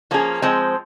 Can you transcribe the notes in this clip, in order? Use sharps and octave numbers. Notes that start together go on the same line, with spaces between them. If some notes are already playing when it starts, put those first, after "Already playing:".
F3 A#3 C#4 G#4
F3 G#3 C4